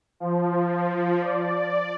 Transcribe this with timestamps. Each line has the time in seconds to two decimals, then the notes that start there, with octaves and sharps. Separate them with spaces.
0.20 F3
1.22 D5